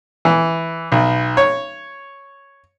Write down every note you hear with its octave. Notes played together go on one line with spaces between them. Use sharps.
E3
B1
C#5